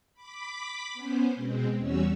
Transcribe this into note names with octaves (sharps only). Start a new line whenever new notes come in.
B5 D6 B6
B3 C#4 C5
B2 G#3 C4
E2 G3 C#4 F#4 C#5 E6